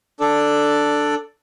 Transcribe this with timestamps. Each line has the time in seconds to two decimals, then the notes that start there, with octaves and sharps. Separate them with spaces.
0.20 D4 A4 D5